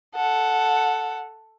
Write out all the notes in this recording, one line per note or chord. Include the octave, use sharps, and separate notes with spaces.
A4 F#5